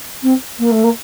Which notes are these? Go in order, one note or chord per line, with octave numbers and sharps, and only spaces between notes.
C4
A#3
A3
A#3